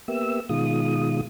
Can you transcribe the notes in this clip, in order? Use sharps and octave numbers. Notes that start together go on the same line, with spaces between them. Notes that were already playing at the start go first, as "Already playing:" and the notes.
A#3 B3 G4 E5 E6
B2 D#3 G#3 F4 D#6